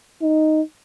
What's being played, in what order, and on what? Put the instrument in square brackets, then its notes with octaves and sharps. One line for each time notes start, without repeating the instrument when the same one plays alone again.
[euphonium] D#4